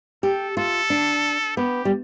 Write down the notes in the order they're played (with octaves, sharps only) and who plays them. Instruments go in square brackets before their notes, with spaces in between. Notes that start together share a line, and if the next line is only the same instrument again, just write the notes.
[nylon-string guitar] G4 [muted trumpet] A4
[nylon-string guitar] F4 [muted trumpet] A4
[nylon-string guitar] D4
[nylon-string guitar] B3 [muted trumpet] G4
[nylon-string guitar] G3